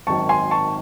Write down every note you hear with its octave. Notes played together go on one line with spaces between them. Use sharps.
G#1 F#2 D#3 A5 C#6
G#5 C6
A5 C#6